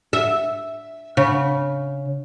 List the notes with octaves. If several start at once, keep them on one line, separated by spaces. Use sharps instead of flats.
E5
C#3